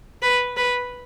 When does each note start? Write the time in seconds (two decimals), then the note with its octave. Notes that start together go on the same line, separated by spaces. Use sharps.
0.22 B4
0.57 B4